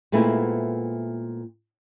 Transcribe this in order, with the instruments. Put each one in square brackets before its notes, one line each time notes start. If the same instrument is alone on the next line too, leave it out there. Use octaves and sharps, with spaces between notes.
[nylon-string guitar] A#2 G#3 A3 B3 C4 E4